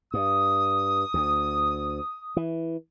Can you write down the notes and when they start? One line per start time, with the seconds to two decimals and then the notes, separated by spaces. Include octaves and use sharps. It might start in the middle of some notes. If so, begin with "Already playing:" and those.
0.14 G2 D#6
1.14 D2
2.37 E3